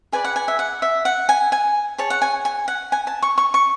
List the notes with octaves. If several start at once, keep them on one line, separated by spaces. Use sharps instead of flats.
G#4 B4 D5 G#5
F#5
G#5
E5
F#5
E5
F#5
G#5
G#5
G#4 C#5 A5
F#5
G#5
G#5
F#5
G#5
A5
C#6
C#6
C#6